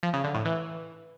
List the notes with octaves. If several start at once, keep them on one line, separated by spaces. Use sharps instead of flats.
F3
C#3
D3
A2
E3